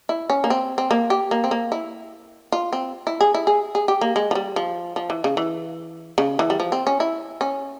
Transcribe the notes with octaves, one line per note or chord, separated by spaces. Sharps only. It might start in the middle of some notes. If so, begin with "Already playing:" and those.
E4
C#4
A#3
C4
C4
A#3
G4
A#3
C4
A#3
E4
F4
C4
E4
G#4
E4
G#4
G#4
G4
A#3
G#3
F3
G3
F3
F3
E3
C#3
E3
C#3
E3
G3
F3
C4
C#4
E4
C#4